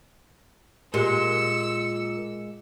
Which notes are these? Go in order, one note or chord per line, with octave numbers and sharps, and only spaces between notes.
A#2 G#3 G4 A#4 E6 C#7